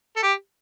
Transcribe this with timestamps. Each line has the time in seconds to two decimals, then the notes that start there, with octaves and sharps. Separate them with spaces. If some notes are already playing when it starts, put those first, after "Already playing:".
0.17 A4
0.23 G4